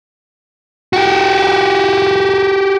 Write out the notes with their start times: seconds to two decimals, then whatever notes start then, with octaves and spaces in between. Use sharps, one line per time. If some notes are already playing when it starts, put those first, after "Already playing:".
0.93 F#4 G4